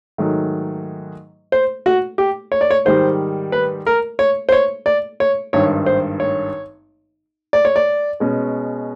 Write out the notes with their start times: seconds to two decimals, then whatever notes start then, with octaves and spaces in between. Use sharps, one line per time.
0.18 G#2 D#3 F#3 A3
1.52 C5
1.86 F#4
2.18 G4
2.52 C#5
2.61 D5
2.71 C#5
2.85 G#2 D#3 G3 C5
3.52 B4
3.86 A#4
4.19 C#5
4.49 C5
4.52 C#5
4.86 D5
5.20 C#5
5.53 G#1 G2 D#3 C#5
5.86 C5
6.20 C#5
7.53 D5
7.65 C#5
7.76 D5
8.20 B2 G#3 C#4